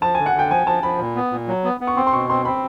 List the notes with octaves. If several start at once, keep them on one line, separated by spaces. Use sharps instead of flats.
F3 A5
D3 G#5
F#5
D3 G5
F3 G#5
F3 A5
F3 B5
A#2
B3
A#2
F#3
B3
B3
C#6
C4 C6
C6
B2 C#6
C4 C6
C4 B5